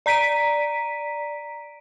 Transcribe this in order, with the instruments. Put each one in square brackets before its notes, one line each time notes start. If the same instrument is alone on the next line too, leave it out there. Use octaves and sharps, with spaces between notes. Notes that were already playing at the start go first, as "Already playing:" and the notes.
[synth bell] D5 A#5 B6 D7 D#7